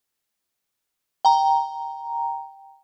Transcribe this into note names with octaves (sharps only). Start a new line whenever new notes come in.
G5 A#5